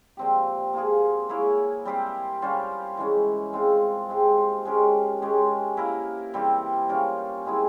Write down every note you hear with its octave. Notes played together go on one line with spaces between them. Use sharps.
A#2 F3 C4 G4
A#3 F4 G#4
A#3 E4 G#4 C#5
G3 C4 G4 C5
G3 C#4 F4 C5
E3 G#3 C#4
G#3 C4 F4
G#3 C4 G4 C5
G#3 C#4 G4 A#4
G#3 C#4 G4
A#3 E4 A#4
E3 G3 C4 G4
G3 C#4 F4 A#4
G#3 C4 E4 G#4